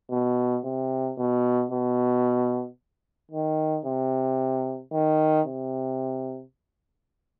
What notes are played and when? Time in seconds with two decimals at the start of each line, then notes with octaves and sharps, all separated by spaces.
0.11 B2
0.64 C3
1.18 B2
1.71 B2
3.31 D#3
3.85 C3
4.93 D#3
5.46 C3